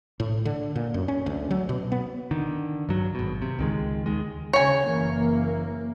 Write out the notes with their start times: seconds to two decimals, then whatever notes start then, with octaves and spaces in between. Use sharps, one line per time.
0.20 A2
0.45 D3
0.75 A#2
0.94 F#2
1.08 C#4
1.26 D2
1.51 F#3
1.69 B2
1.92 B3
2.31 D3 D#3
2.89 G2 F#3
3.15 G#1 B2
3.42 C3
3.59 C#2 D#3 G#3
4.06 D#2 D#3 G#3
4.53 C#3 C#5 G#5
4.85 F#1 E3 A#3